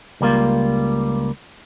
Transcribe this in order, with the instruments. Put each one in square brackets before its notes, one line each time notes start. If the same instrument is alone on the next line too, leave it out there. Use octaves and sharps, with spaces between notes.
[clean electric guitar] C#2 G3 A#3 F4